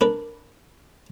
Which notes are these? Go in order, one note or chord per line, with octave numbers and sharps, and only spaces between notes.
D4 A#4 B4